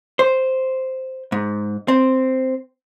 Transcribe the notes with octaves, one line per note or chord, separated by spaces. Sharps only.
C5
G#2
C4